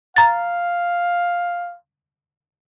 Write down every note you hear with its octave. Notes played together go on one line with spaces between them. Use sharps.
F5 A#5 A6